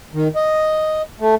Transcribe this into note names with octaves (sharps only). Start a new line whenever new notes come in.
D#3
D#5
A3